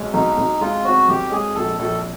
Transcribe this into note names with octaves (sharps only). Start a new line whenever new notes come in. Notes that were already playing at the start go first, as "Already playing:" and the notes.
Already playing: B1 G#3
B1 D#4
B1
G#3 F4
C4 F#4
B1 G4
G#3 G#4
A#1 A4
A#1 A4